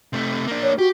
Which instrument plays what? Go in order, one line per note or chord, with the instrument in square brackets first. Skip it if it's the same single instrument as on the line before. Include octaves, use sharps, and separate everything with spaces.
[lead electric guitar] C3 A3
A#3 D4
[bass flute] C#5
[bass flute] F#4 [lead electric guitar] G4